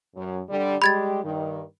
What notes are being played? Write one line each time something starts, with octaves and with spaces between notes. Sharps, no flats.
F#2
D3 G3
G3 G#3 G4 B5 G#6 A6
G2 D#3